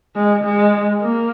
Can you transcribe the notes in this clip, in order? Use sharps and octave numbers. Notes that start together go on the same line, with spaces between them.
G#3
G#3
A#3